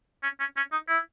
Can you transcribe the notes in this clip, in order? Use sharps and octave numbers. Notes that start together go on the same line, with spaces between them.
C#4
C#4
C#4
D#4
E4